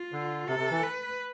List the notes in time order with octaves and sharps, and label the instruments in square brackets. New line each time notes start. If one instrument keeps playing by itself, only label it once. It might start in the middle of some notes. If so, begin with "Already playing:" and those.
Already playing: [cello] F4
[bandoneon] D3
[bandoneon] C3 [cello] A4
[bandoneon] C3
E3
[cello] B4